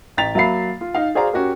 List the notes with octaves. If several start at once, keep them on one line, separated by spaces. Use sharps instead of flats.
A1 G5 A#5 A6 B6 F7
F#3 A#3 E5 F5 B5 C7
F4
D#4 F5
F#4 G#4 C5 D5 F5 A#5
C#4 F#4 G4 A#4